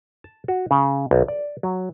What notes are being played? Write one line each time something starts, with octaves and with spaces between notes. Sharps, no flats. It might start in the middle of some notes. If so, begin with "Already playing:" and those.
A5
F#4
C#3
B1
D5
F#3